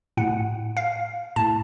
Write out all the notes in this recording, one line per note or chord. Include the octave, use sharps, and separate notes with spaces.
A2 F#5
F5
A2 A5